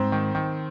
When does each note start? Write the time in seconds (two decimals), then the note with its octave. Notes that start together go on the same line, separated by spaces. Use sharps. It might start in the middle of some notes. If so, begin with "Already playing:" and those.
Already playing: G#2 C4 C5
0.12 D#3
0.35 D#3